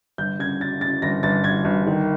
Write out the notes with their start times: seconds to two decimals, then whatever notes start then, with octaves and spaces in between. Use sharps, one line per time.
0.18 G1 G6
0.39 C#3 G#6
0.60 C#3 A6
0.81 C#3 A6
1.02 G1 A#6
1.23 G1 A6
1.44 G1 G#6
1.65 G1
1.87 D#3